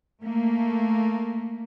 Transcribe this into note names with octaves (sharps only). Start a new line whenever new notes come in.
A3 A#3